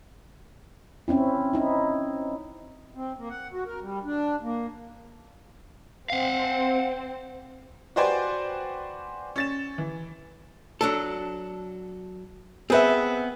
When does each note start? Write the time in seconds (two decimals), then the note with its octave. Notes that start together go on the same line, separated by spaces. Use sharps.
1.08 C4 C#4 E4
1.53 D#4 E4
2.95 C4
3.17 A#3
3.30 F#5
3.53 F#4
3.66 A#4
3.81 G3
4.04 D4
4.42 A#3
6.10 C4 F5 F#5
7.96 F#4 B4 C5 D5 G5 G#5
9.36 C#4 A6 E7
9.78 E3
10.81 F#3 D4 A4
12.70 B3 C4 G#4 B4 E5